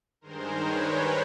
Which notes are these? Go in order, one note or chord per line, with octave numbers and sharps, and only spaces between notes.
G2 D#3 G#3 A#4 C5
B4 C#5